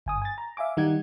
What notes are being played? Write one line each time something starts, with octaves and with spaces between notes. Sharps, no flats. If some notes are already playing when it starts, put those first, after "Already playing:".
G1 G#5 D#6
G#5 A6
A#5
E5 F5 G#5 D6
D#3 G3 D#4 F#5 G#6